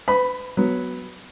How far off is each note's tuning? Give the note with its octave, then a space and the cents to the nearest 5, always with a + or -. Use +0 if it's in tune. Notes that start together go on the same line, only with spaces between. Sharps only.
B4 +35 B5 +0
F#3 +0 B3 +0